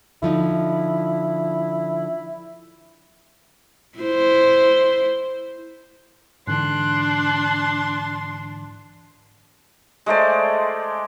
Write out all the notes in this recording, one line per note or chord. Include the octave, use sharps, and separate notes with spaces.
D3 F3 D#4 E4
E4 C5
G#2 D3 E3 D4 C6 F#6
G#3 A3 C5 D5